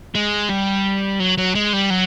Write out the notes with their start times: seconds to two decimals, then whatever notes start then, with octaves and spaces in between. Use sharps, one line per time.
0.15 G#3
0.49 G3
1.19 F#3
1.38 F#3
1.55 G#3
1.73 G3
1.90 F#3